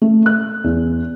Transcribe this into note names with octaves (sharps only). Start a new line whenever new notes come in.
A3
F#6
E2